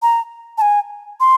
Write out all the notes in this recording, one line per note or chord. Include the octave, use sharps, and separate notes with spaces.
A#5
A5
G#5
C6